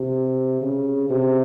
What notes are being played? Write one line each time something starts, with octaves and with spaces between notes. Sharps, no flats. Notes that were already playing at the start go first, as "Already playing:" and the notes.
Already playing: C3
C#3
C3